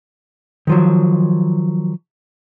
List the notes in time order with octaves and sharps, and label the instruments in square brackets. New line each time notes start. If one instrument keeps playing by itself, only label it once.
[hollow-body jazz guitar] D#3 F3 F#3